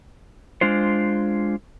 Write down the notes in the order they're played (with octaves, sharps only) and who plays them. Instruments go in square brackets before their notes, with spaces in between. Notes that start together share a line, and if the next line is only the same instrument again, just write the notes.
[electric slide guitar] G#3 D4 F4 C5